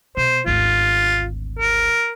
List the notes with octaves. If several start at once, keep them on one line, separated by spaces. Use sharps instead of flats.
B2 C5
G#1 D2 F4
A#4